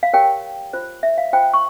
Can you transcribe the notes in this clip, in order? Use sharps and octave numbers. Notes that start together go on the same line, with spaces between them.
F5
G4 A#4 C#5 G5
F4 C5
E5
F5
F4 C5 G5
C#6